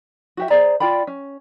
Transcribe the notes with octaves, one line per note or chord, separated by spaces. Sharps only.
F#4 G4 E5
G#4 C5 D5 A#5
F4 D5 G5 B5
C#4